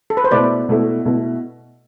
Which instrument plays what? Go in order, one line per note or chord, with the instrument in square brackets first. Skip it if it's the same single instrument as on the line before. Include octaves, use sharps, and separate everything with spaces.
[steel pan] A4
B4
C5
[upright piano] B2 A3 E4 A4 [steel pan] B4 D5
[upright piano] B2 A3 E4 A4
B2 A3 E4 A4